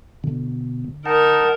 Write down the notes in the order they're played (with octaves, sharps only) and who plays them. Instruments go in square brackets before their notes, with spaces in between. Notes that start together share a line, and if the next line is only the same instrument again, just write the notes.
[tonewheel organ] B2 [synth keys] D3
[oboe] D#4 [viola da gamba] A#4 [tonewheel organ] F#5 A5